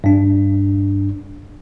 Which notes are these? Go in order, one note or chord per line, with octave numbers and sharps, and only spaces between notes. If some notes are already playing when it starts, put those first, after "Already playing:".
G2 D4